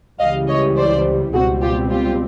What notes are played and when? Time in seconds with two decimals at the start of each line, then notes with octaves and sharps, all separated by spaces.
0.20 C#2 C#3 E3 G3 D#5 F5
0.48 C#5 D#5
0.77 C5 D5
1.33 C#2 B2 G3 C4 F#4 G#4
1.62 F4 G4
1.90 F4 G4